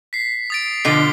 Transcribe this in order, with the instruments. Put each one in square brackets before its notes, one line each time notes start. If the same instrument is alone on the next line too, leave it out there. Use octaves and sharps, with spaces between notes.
[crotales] B6 C7
D#6 A6 D7
[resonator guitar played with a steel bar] B2 D3 F3 [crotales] C7 G7